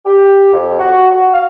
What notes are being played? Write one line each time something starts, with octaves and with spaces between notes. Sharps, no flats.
G4
F2
F#4
F#4
F5